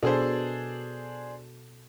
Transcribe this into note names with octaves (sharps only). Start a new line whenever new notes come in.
B2 D4 G#4 A4 C5